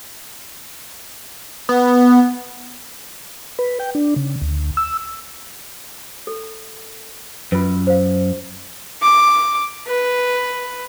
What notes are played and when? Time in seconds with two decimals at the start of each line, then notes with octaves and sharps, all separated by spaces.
1.69 B3
3.59 B4
3.80 G5
3.95 D4
4.16 C#3
4.42 D2
4.77 E6
6.27 A4
7.52 F#2 F4 B4
7.87 C5 F5
9.02 D6
9.88 B4